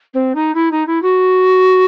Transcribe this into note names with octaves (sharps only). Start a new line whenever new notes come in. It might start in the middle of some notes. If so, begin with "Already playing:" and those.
C4
D#4
E4
D#4
E4
F#4